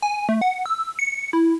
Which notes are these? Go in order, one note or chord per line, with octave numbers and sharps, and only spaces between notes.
G#5
A3
F#5
E6
C#7
E4